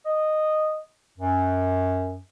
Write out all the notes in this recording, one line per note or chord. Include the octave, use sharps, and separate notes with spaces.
D#5
F#2